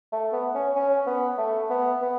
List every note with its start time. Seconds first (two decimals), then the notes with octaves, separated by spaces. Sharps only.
0.13 A3
0.33 B3
0.54 C#4
0.76 C#4
1.07 B3
1.38 A3
1.70 B3
2.02 B3